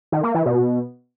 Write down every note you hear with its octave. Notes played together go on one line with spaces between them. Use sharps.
D#3
A#3
E3
B2